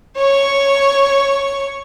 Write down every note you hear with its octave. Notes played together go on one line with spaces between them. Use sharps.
C#5 C#6